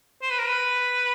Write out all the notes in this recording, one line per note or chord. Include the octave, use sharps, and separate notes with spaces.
C5
B4
A#4
B4